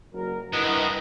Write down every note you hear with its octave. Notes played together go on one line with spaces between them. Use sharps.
F#1 F#3 A#4
G2 E4 A#4 B4 D#5 F#5